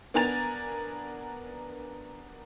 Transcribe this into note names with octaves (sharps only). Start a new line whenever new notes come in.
B3 D4 A#4 G#5 A6 F7